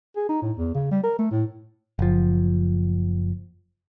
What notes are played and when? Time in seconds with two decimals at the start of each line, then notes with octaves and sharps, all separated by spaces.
0.16 G#4
0.29 D#4
0.42 A2
0.57 E2
0.74 C#3
0.91 G3
1.04 A#4
1.19 A3
1.31 A2
1.99 F#1 F3